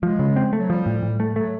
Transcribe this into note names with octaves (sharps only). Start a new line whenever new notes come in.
F3 G#3
C#3
C4
A3
F#3
F3 G3
A2
A2
A3
F#3 A3